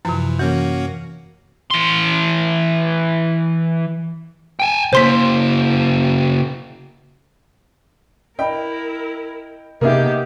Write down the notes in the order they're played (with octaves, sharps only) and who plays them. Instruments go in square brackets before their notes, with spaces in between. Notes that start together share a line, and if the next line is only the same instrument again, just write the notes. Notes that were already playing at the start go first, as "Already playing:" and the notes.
[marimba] F#2 C3 [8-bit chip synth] E3 F3
[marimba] E3 [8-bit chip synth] A#3 C#4 F#4
[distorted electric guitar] E3 C6
[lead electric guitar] G5 G#5
[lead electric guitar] C#3 A#3 [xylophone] C5 C6 B6
[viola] E4 A#4 [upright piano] D#5 B5 [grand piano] G5
[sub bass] C3 [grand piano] A#3 D#4 G#4 [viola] B3 G4 [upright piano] A#4 E5